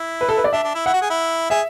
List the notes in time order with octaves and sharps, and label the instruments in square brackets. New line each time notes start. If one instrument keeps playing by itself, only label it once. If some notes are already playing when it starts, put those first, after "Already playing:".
Already playing: [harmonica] E4
[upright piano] B4
A4
B4
D5
[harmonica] D4 [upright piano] E5
[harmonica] D4
E4
[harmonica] E4 [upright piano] F#5
[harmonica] F#4
G#4
E4
[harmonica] G#4 [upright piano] E5